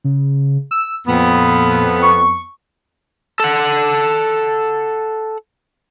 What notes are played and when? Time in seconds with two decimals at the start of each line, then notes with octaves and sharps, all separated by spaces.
0.04 C#3
0.71 E6
1.08 F2 A#2 B3
2.02 C#6
3.40 A4 F#5